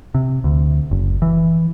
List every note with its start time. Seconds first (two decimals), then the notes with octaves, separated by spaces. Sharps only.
0.15 C3
0.44 D2
0.91 F#1
1.22 E3